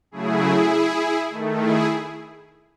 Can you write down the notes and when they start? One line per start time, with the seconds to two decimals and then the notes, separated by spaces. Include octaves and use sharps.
0.11 C#3 F#3 A3 E4 G#4
1.30 D#3 A3
1.60 E4 G#4